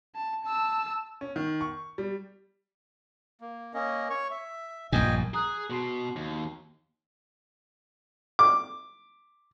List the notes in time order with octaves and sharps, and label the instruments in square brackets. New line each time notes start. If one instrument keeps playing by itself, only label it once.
[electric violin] A5
A5 E6
[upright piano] C#4
D#3
C#6
G3
[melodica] A#3
A#3 C#4 D#5
C#5 C#6
E5
[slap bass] A#1 G2 A#2 [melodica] D#5 G5 G#5
[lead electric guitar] G#4 [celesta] A#5 D#6 F#6
[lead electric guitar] B2 [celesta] F#4 C6 C7
[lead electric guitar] D#2
[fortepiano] D6